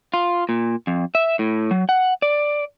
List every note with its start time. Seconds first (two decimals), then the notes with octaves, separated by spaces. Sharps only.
0.14 F4
0.49 A#2
0.87 F2
1.15 E5
1.39 A2
1.71 F#3
1.89 F#5
2.22 D5